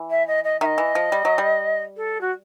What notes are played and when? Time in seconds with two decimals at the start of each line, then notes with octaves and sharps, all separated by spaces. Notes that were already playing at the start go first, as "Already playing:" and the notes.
Already playing: E3
0.10 E5
0.28 D#5
0.44 D#5
0.61 D#3 D#5 E5
0.78 E3
0.95 F3
1.12 G3
1.25 F#3
1.38 G3
1.97 A4
2.21 F#4